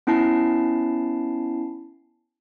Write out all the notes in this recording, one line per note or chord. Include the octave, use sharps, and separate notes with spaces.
B3 C#4 E4 A5 C7